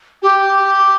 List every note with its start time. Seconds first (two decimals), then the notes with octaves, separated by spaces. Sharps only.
0.22 G4